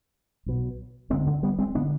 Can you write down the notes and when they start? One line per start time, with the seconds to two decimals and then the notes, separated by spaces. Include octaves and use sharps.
0.46 B1 B2
1.10 D2 D3 G#3 C4
1.27 D3
1.43 G3 B3
1.59 G#3 C4
1.75 D3 B3 D4